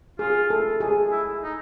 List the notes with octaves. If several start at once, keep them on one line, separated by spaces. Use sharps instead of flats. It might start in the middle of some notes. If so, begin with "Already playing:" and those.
F4 G#4
A4
G#4
E4
D#4